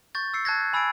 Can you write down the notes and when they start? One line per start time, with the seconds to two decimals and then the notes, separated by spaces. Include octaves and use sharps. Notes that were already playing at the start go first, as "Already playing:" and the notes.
0.15 C#6 G6 A6
0.34 E6 C7 C#7
0.45 A5 F#6 G#6 A#6
0.61 A#6
0.73 G#5 B5 E6 A6 C7 D7